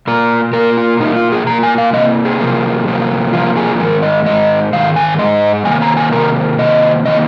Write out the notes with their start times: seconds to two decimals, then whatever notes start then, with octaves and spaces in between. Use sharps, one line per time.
0.07 A#2 A#3 A#4
0.53 A#2 A#3 A#4
0.77 F4
1.00 A#2 A#3 D#4
1.16 F4
1.32 G#4
1.47 A#2 A#3 A#5
1.63 G#5
1.78 F5
1.93 C3 F3 A#3 D#5
2.25 G#4
2.41 C3 F3 A#3
2.86 C3 F3 A#3
3.33 C3 F3 A#3 F4
3.57 G#4
3.79 G#2 D#3 G#3 A#4
4.03 D#5
4.26 G#2 D#3 G#3 D#5
4.73 G#2 D#3 F5
4.96 G#5
5.19 G#2 D#3 G#3 D#5
5.65 C3 D#3 A#3 G#5
5.82 A#5
5.97 G#5
6.13 C3 D#3 A#3 A#4
6.59 C3 D#3 A#3 D#5
7.05 C3 D#3 A#3 D#5